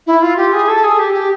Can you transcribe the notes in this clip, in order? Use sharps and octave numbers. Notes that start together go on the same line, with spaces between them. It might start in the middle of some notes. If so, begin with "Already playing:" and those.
E4
F4
G4
G#4
A4
G#4
G4
G4